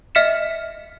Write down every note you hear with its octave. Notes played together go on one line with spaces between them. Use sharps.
D#5 E5 F6 B6 C#7 E7